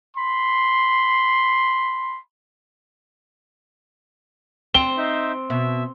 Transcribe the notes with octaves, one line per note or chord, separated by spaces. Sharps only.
B5 C6
C4 G7
D#4 C5 E5
B2 E5